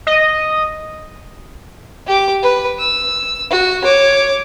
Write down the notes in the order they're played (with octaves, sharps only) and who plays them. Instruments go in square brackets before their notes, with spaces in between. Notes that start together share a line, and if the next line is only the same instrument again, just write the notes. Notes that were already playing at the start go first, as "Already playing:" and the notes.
[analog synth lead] D#5
[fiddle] G4 D6
B4
E6
F#4
C#5 D6